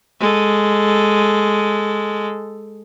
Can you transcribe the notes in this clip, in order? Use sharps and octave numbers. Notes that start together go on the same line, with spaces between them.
G#3 A4